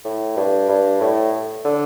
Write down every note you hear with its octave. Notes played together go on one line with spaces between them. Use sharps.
A2
G2
G2
A2
D3